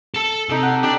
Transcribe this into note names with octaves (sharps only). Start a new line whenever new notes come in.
A4 A5
C3 D#4 A4
F#5
D4 G4 D5